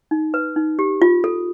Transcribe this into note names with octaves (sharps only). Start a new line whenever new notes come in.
D#4
B4
D#4
G4
F4
A4